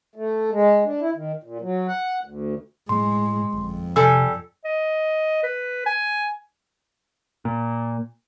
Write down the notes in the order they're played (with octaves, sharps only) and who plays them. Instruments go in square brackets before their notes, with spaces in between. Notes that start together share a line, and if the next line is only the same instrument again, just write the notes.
[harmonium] A3
G#3
D4
E4
D#3
A#2
F#3
F#5
D2
[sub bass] A2 [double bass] G#3 [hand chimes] C6
[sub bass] G1 [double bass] F2
[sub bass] C3 [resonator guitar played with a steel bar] G3 A4 G#5 [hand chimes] E6
[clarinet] D#5
B4
G#5
[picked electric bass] A#2